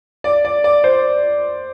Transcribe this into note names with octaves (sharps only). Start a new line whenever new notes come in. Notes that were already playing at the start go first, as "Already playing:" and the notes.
D5
D5
D5
C5